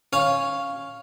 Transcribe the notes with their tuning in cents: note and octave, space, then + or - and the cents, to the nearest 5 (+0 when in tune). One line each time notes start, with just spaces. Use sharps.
C#4 +0 F5 +0